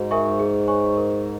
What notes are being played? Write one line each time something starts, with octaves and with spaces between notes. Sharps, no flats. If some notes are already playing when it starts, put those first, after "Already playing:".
Already playing: G#2 F#4
A#4 E5 G#5 C#6
G#4
C#5 G#5 C#6
A#4